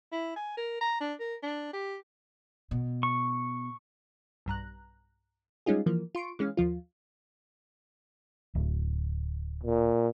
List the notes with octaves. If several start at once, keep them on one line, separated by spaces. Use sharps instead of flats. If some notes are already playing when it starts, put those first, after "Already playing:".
E4
G#5
A#4
A#5
D4
A#4
D4
G4
B2
C#6
B1 G2 A#5 F#6
G3 G#3 C#4 D#4 F4 G#4
E3 F3 A#3
F4 C6 C#6 D7
E3 G#3 C#4 F5
D#2 F3 F4
D1
A#2